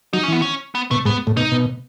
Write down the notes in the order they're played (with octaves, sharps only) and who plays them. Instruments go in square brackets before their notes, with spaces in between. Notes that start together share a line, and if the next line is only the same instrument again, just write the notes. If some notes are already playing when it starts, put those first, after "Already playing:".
[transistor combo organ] F#3 [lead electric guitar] D#4
[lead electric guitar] C#4
[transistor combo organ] E3 [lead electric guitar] B3
[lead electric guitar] C#4
B3
[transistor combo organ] B2 [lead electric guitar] A3
[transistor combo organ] G#2 [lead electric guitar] B3
[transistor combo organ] A2
[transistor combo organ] B2 [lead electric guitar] D#4
[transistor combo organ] B2